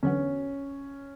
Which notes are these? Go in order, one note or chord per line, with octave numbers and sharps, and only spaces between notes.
E2 D3 F#3 B3 C#4